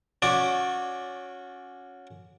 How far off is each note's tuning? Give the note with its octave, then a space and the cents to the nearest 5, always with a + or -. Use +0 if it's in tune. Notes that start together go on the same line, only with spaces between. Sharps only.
C#4 +0 F#4 -25 D5 +0